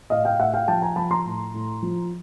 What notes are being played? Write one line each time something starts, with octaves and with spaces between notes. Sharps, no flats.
A2 D#5 F5
F5 G5
A2 E5 F#5
F5 G5
F3 G5 A5
G#5 A#5
F3 A5 B5
A#5 C6
A2
A2
F3